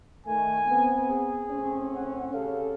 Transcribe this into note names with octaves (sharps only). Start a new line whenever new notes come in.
D#3 A3 G#5
B3 C4
G#4
A2 C4 C#4
F#5
C#3 G4 A4 F5